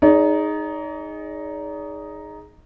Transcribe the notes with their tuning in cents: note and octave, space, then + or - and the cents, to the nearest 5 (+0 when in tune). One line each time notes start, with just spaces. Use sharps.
D#4 +0 G#4 +0 D5 -45